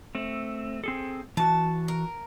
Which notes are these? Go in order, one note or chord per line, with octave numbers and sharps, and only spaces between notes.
A3 C4
C4 G#4 A4
E3 F#4 A5
A#4